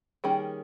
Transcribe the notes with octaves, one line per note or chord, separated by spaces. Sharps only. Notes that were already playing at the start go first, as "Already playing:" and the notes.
D#3 G3 A#3 C#4 G#4